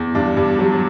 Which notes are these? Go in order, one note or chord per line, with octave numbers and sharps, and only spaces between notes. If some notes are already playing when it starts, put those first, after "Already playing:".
Already playing: E2
G2 D4
G2
F#3